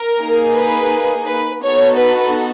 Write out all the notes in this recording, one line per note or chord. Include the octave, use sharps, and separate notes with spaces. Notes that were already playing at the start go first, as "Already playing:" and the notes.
Already playing: A#4
A#3 D#4 G#4
B4
B4
B3 D#4 F#4 A4 C#5
B4